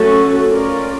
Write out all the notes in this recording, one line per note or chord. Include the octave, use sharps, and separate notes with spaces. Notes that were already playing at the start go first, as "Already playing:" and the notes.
Already playing: F#3 A3 C#4 F#4 A4
C#4 F4 A#4 D5